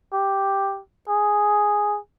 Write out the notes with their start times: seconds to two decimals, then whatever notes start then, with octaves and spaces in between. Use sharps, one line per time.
0.13 G4
1.09 G#4